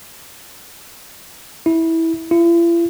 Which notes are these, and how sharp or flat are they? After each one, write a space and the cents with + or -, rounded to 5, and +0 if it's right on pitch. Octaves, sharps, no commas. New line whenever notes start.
E4 -15
E4 +45